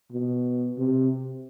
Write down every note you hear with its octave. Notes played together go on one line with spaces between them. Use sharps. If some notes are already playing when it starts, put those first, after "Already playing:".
B2
C3